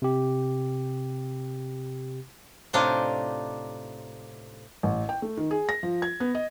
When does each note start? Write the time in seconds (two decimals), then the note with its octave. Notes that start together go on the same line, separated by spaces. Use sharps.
0.02 C3 G4
2.73 A2 C3 D4 D#4 F4
4.83 A1
5.09 G5
5.22 A3
5.37 D#3
5.51 G#4
5.69 A#6
5.83 F3
6.02 G#6
6.20 B3
6.35 D#5